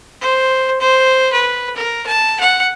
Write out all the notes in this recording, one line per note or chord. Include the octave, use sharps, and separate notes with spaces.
C5
C5
B4
A#4
A5
F#5